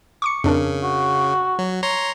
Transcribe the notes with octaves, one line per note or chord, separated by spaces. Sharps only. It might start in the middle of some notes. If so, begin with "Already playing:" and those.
C#6 D6 C#7
F2 C#3 D4 A#4
F#4
F#3
C#5 A#5 C6